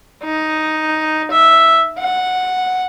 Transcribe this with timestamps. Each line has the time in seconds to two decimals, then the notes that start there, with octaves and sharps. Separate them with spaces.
0.24 D#4
1.31 E5
1.99 F#5